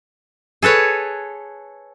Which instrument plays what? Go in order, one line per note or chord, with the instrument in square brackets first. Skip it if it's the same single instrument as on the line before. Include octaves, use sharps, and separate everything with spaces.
[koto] G#4 A4 B4 C#5